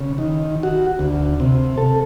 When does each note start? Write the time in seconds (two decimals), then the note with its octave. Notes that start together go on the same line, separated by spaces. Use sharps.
0.01 C#3
0.18 D#3
0.63 F#4
0.99 D2
1.40 C3
1.78 A4